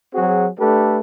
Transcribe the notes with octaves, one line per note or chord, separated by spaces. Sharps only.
F#3 C4 F#4 G#4
A3 D4 G4 A4 B4